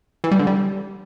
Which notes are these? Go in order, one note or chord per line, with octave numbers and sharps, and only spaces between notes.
E3
G3
D3
G3